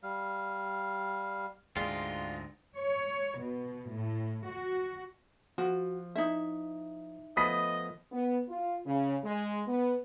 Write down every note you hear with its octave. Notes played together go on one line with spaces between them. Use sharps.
G3 F5
D2 G#2 G#3 F4 D5 G5
C#5
B2
A2
F#4
F3 F#4
D#4 E4 E5
F3 A3 B3 D#5 B5 D#6 B6
B3
F4
C#3
G#3
B3